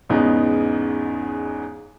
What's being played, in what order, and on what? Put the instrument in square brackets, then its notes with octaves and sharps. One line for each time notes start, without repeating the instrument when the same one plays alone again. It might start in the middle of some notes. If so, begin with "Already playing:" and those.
[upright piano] E2 G#2 C#3 G#3 B3 D#4